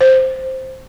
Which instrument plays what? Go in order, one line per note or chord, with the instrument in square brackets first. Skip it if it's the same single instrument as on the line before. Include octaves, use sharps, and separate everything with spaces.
[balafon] C5